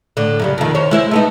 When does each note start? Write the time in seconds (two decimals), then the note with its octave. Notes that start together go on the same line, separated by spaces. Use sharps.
0.17 A2 D3
0.39 F#2 C#3 G3
0.58 F2 D#3
0.75 D#3 C5 C#5
0.91 G#3 E4 C5
1.11 A3 B3 D#4